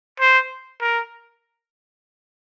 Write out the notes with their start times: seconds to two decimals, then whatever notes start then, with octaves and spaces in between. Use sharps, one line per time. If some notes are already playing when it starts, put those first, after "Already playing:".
0.20 C5
0.81 A#4